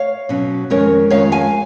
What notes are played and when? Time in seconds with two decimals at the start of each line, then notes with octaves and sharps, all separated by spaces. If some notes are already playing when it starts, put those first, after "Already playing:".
Already playing: C#5 F5
0.29 B2 F#3 C#4
0.70 F2 D#3 G#3 C#4 A#4 C#5
1.10 F2 D#3 G#3 C#4 C#5 F5
1.32 F5 G#5